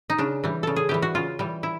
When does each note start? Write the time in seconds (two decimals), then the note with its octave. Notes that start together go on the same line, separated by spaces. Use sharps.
0.10 D#4
0.18 C#3 D4
0.44 E3 G3
0.63 C#3 A4
0.76 G#4
0.89 E3 G3 G4
1.02 F#4
1.15 C#3 F4
1.39 E3 G3
1.63 E4